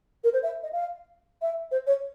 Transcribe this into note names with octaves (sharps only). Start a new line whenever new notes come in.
A#4
C5
E5
D#5
F5
E5
C5
C#5